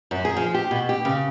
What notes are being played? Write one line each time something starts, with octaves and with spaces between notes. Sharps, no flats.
F#2
G#4
F3
G4
B2
G4
C#3